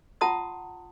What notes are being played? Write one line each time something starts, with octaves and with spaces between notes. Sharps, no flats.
F4 F#5 A5 A#5 C6 D#6